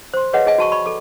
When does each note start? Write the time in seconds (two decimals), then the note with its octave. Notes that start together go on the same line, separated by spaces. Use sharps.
0.14 C5 C6
0.33 G#4 B4 C#5 D#5 F#5
0.46 G#4 D#5 G#5
0.58 F#4 A5 C#6
0.72 D5 B5 C#6
0.86 A4 D6